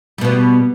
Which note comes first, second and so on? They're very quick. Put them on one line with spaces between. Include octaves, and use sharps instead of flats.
G3 B2 B3